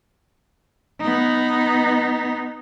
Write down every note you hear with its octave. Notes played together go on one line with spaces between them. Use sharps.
B3 D#4